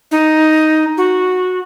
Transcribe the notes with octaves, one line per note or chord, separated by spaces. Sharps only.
D#4
F#4